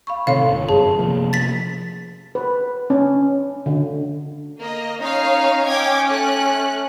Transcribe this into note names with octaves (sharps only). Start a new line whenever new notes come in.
F5 B5 C#6
A2 C3 D#3 A4 C#5 F5 C6
D1 G1
G1 F#2 G#4 A5
C3 F3 A#3
A6 B6
B4
C#4
D3
A#3 D#5
C#4 D#4 C#5 F5
C#4 G5 D6 G#6
A3 F#6